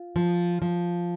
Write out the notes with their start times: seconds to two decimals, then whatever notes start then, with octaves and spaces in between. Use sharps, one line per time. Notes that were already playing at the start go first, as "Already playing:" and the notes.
Already playing: F4
0.16 F3
0.62 F3